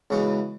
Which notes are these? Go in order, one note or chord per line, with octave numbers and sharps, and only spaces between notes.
C#2 C#3 E3 B3 F#4